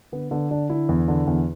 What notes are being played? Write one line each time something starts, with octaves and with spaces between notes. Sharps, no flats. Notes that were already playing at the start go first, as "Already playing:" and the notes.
D3 B3
D3 B3
D3 D4
D3 E4
E2
D3
E2